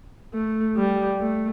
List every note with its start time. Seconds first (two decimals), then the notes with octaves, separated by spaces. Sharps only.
0.34 A3
0.77 G3
1.20 A3